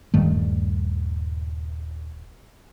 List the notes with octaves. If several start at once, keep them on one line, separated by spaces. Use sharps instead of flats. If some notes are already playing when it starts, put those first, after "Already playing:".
D#1 G2 D#3 A3